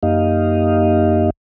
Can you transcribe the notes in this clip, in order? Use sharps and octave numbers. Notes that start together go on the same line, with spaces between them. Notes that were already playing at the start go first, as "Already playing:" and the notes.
F#2 A#3 D#4 G4 D#5 F5